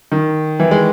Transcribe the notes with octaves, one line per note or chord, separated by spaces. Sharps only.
D#3
E3
G#3